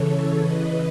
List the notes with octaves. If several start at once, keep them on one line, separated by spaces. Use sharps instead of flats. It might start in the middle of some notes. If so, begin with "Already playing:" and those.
Already playing: C#3 E3 A4 C#5
C#3 E3 B4 D#5